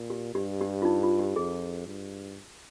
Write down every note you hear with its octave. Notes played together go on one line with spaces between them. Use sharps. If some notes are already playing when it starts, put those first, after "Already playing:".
Already playing: A#2
G4
G2 G4
G4
F4
D#4
F4
G4
F2 G#4
G2